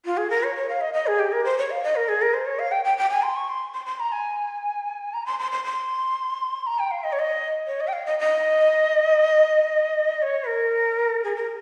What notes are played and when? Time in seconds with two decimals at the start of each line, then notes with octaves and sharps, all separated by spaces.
0.05 F4
0.17 G#4
0.30 A#4
0.43 C#5
0.56 C#5
0.68 F5
0.80 D#5
0.93 D#5
1.07 G#4
1.19 G4
1.32 A#4
1.44 C5
1.58 C#5
1.70 F5
1.83 D#5
1.95 A#4
2.08 G#4
2.21 A#4
2.33 C5
2.46 C#5
2.59 F5
2.71 G5
2.84 G5
2.97 G5
3.09 G#5
3.22 C6
3.36 C#6
3.48 C6
3.74 C6
3.86 C6
3.99 A#5
4.12 G#5
5.13 A#5
5.26 C6
5.39 C6
5.51 C6
5.64 C6
6.66 A#5
6.78 G5
6.91 F5
7.03 D#5
7.12 C#5
7.19 D#5
7.67 C#5
7.80 D#5
7.87 G5
7.92 F5
8.05 D#5
8.18 D#5
10.22 C#5
10.47 A#4
11.24 G#4
11.35 A#4